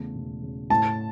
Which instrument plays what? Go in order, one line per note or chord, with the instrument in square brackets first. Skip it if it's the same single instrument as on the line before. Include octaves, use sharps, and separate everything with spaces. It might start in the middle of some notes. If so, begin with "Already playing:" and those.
Already playing: [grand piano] E2 C#3 A3
E1
C#3
[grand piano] A2 [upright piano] A5